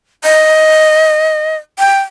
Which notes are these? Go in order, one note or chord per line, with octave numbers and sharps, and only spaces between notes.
D#5
G5